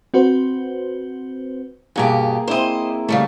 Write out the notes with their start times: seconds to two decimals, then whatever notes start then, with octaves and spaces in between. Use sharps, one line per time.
0.14 C4 F#4 B4 C5
1.96 G2 B2 A#3 G4 G#4
2.48 C4 E4 C5 D#5 D6
3.09 C#3 G3 A3